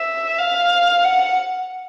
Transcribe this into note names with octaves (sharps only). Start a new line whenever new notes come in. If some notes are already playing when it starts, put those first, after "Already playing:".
Already playing: E5
F5
F#5